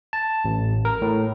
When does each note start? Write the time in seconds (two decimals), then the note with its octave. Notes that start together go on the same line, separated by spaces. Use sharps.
0.13 A5
0.45 A1
0.85 A#4
1.02 A2